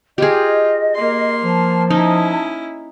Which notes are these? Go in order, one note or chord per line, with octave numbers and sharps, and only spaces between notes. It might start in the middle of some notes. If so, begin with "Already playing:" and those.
F4 G4 G#4 D#5
A#3 C6
F3 A5
C#4 D#4 E4